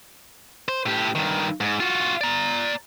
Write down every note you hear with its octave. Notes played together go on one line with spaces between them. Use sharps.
C5
A2 G4
G2 D#3
G#2
F4 F#4
D5 A#5